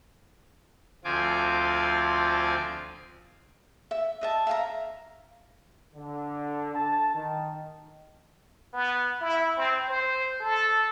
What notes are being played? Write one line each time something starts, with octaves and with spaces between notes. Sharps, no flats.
D2 F3 C4 F4 G#5 D6
E5
D#5 E5 A5
E5 F5 G#5 A#5
D3
A5
D#3
B3
E4
C4
C5
A4